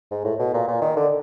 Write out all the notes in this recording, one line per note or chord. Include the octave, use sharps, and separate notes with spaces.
G#2
A2
B2
A#2
A#2
D#3
D3